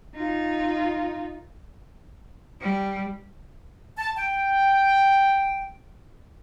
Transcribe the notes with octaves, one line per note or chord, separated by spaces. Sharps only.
D#4 F4
G3
A5
G5